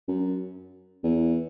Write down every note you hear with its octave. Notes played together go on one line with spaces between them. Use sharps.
F#2
E2